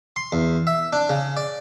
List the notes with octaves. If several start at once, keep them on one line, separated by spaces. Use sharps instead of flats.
C6
E2
E5
D4
C#3
D5